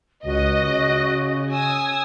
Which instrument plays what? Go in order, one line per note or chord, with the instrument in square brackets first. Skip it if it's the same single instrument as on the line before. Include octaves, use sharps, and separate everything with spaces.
[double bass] C#2 [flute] F#4 [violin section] D#5
[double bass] C#3
[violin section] G#5 D#6 E6